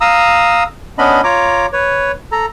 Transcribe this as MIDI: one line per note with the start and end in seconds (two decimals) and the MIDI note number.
0.01 0.63 77
0.01 0.63 82
0.01 0.63 87
0.01 0.63 88
0.98 1.21 59
0.98 1.21 61
0.98 1.21 62
0.98 1.21 75
0.98 1.21 83
1.24 1.66 65
1.24 1.66 73
1.24 1.66 82
1.24 1.66 86
1.73 2.12 71
1.73 2.12 73
2.32 2.46 69
2.32 2.46 82